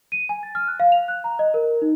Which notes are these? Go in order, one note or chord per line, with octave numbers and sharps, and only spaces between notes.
D#7
G#5
A6
F6
F#6
F5
F7
F#6
A#5
D#5
A#4
D#4